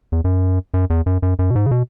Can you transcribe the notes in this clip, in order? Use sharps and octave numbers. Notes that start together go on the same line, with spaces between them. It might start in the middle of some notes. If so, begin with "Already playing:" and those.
E2
F#2
F#2
E2
F#2
F#2
F#2
B2
G#2
C#3
B2